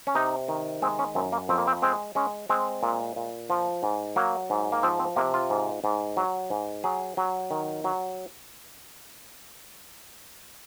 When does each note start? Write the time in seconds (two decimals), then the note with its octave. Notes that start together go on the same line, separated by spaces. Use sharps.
0.07 C#4
0.15 C3 D#4
0.48 D#3
0.82 G#3 C4
0.99 C#4
1.15 F#2 C4
1.32 A#3
1.49 F2 C4
1.58 A#3
1.67 C4
1.82 G#3 C4
2.15 G#3 C#4
2.49 G#3 C4
2.83 A#2
3.16 A#2
3.50 F3
3.83 G#2
4.16 F#3 A#3
4.50 G#2
4.72 A#3
4.83 F3 C4
4.99 C4
5.16 C3 A#3
5.34 F4
5.50 G#2
5.84 G#2
6.17 F#3
6.50 G#2
6.84 F#3 G#4
7.17 F#3
7.51 D#3
7.84 F#3